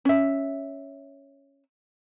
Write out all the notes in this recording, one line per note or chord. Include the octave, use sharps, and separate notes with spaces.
C#4 E5